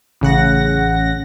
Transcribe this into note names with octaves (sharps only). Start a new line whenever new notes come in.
A1 C#3 F#5 A#6